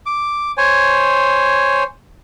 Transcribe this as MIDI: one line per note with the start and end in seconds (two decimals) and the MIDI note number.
0.06 0.52 86
0.57 1.84 72
0.57 1.84 73
0.57 1.84 80